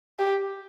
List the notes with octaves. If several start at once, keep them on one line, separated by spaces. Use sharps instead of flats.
G4